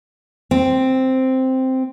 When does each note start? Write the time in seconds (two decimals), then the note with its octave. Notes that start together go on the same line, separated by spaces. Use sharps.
0.51 C4